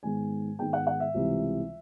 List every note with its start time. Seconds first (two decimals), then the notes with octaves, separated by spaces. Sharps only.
0.03 G#2 D#3 G#3 B3 G#5
0.59 G#2 D#3 G#3 B3 G5
0.73 F#5
0.87 F#5
1.00 E5
1.14 C#2 C3 E3 G3